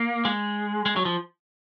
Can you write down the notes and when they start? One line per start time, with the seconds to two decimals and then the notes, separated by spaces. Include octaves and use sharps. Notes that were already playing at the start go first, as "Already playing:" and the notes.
Already playing: A#3
0.25 G#3
0.86 G#3
0.96 F#3
1.05 F3